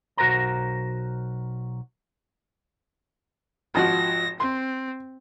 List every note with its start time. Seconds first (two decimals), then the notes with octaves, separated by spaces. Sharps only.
0.17 B1 F#4 A#4 C5 A#5
3.75 G#1 F3 F#4 A#6
4.40 C4 C6